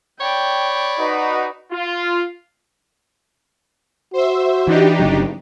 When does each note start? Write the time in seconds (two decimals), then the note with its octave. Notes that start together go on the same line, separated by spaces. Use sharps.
0.21 C#5 D5 G5 B5
0.99 D#4 F#4 B4
1.71 F4
4.13 F#4 C5 E5
4.67 E3 D4 D#4 G4
5.00 G1 C#3 F#3